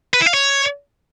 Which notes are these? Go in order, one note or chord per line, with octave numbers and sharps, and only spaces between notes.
B4
E4
F5
C#5